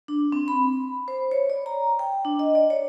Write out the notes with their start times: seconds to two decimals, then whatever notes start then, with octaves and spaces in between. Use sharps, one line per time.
0.08 D4
0.32 C4
0.48 B5
1.08 C5
1.31 C#5
1.50 D5
1.66 A#5
1.99 G5
2.25 D4
2.39 D#5
2.55 D5
2.70 C#5